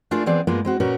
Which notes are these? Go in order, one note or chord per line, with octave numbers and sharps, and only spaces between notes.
A3 D4 F4 G#4 A#4 D5
E3 B3 C4 G#4 D5
G2 G#3 A#3 B3 F4
G#3 C4 F#4
A#2 C#4 F#4 A#4 B4